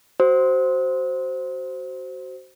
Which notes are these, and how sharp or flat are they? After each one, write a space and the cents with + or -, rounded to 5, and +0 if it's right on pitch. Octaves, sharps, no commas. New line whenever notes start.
F#4 +20 C5 +0 D#6 +45